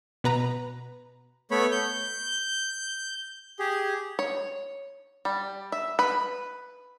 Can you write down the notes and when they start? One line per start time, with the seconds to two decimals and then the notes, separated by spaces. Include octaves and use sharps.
0.24 B2 B4 A#5
1.51 A3 B3 C#5 B5
1.72 G6
3.59 G4 G#4
4.19 C#5
5.25 G3
5.72 E5
5.99 B4